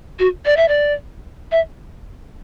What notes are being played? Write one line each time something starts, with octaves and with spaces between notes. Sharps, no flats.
F#4
D5
E5
D5
E5